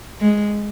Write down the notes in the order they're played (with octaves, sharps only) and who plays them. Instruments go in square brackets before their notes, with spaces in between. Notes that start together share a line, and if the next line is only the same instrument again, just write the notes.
[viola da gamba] G#3